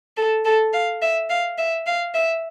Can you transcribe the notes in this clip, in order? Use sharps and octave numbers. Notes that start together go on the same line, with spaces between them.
A4
A4
F5
E5
F5
E5
F5
E5